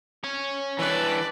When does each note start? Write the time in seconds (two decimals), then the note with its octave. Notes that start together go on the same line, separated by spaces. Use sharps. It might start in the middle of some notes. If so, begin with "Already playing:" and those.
0.24 C#5 G#5
0.79 E3 D4 B4 D5